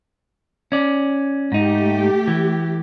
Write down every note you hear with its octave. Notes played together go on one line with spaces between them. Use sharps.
C#4 D5
G#2 A3 D#4 G4
E3